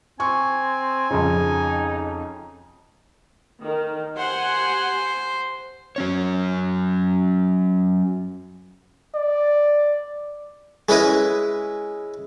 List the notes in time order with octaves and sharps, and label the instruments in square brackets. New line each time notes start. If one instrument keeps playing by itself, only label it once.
[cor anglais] C4 [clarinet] G#5 [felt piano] C#6
[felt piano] F2 C#3 [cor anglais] D#4
[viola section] D#3
[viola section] G4 F#5 G#5 [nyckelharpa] C5
[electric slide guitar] F#3 C#4 C#5
[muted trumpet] D5
[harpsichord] G#3 C#4 E4 B4 D#5